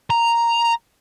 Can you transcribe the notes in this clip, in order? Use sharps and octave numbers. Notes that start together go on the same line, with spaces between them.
A#5